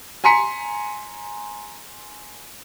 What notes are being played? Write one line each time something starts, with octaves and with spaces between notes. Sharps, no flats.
G#5 A#5 C6 B6 C#7